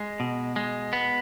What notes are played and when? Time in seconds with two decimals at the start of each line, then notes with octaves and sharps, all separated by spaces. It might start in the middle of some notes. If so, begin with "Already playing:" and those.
Already playing: G#3
0.20 B2
0.56 G#3
0.93 B3